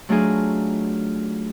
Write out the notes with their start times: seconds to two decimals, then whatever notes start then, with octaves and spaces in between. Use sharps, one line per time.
0.09 F#3 A3 D4 D#4 F4 G#4